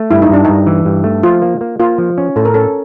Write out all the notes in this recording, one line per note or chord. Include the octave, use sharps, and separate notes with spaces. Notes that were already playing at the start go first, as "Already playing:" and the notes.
Already playing: A3
G2 E4
D#4
G2 D4
G2 D#4
E3
G2
A3
F3 F4
A#3
A#3
A#3 F4
F3
C#4
A2 A4
A#4
C#4 A4